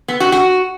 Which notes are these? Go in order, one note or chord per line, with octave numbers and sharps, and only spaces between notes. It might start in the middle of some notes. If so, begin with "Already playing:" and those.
B3
F#4
F#4